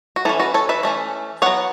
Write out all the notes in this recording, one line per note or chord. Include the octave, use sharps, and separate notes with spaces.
F#4
E3 C#4 E4 A4
F#4 B4
A4 C#5
B4 E5
E3 A3 C#4
F#3 B3 C#5 F#5